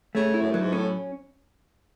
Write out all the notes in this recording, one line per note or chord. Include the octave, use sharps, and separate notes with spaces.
C#3 A3
E4
F#2
G2 F#3
G#2
A2 C#4